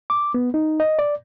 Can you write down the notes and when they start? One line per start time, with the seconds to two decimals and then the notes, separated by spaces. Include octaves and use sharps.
0.10 D6
0.34 B3
0.54 D#4
0.80 D#5
0.99 D5